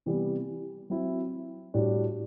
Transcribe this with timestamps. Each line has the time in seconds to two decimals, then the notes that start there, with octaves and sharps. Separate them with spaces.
0.06 C3 E3 G3 B3
0.90 F#3 C4 E4
1.74 A2 G3 D4 F#4